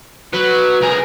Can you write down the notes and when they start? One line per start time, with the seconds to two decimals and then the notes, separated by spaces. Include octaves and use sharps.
0.33 F#3 B4
0.81 C2 G#4 A#4